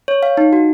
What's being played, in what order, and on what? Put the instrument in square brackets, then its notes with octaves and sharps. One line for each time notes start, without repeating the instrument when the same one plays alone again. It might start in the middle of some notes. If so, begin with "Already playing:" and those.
[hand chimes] C#5
F5
D#4
F#4